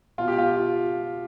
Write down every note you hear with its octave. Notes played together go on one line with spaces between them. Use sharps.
B2 F4
G4
F4